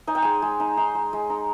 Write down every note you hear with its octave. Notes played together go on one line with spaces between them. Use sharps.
D#4 G#5
G5
G#3 G#5
G#3
D#4
D#4 C6
G#3
G#3
D#4